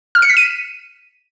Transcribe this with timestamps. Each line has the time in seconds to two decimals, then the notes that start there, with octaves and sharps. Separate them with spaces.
0.15 F6
0.22 C#7
0.29 B6
0.37 D#7